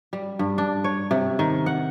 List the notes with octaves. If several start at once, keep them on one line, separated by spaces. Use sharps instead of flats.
G3
G2
D4
C#5
C3
D#3
F#5